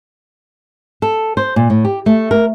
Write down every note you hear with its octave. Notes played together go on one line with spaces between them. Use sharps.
A4
C5
A#2
A2
G4
A3
A#4